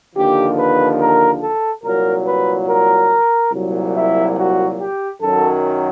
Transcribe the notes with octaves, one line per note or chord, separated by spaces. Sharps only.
D#2 D3 F3 G4
B4
A#4
A4
C2 A#2 F#3 A#4
B4
A#4
C2 A#2 F#3
E4
F#4
G4
F#2 D#3 F#3 A4